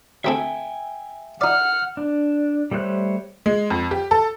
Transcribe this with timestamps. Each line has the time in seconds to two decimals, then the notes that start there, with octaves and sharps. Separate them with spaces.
0.24 D2 C4 A4 E5 G5 G#5
1.41 D#4 D5 F#5 F6
1.97 D4
2.71 G3 A3 C5 C#5 F#6
3.46 G#3
3.70 F2
3.91 G4
4.11 A4